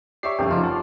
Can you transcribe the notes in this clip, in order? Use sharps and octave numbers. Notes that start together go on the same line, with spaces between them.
G4 C#5 D5 E5 C#6 C7
F1 F#2 A3 G4 F5 G5
C#3 F3 D#4 F4 A#4
F#5 A5